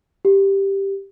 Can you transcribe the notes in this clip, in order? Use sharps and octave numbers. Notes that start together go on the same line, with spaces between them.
G4